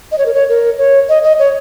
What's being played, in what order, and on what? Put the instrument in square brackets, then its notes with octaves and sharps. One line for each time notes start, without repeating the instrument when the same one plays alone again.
[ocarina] D#5
C#5
A#4
C#5
A#4
C#5
D#5
D#5
C#5